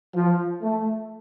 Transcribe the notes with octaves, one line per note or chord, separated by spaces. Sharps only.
F3
A3